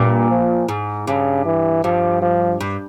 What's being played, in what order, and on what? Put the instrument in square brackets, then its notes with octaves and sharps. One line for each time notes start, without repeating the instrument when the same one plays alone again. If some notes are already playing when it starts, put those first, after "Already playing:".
Already playing: [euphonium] G2 [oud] A#2
[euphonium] F3
[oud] G#2
[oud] G2 [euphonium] C#3
[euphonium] E3
[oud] G2 [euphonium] F3
[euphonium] F3
[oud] G2